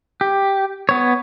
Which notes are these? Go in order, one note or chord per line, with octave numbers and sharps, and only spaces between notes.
G4
B3 C#5